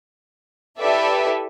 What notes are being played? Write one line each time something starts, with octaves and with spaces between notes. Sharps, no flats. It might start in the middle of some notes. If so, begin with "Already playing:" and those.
E4 G4 A4 B4 D5 E5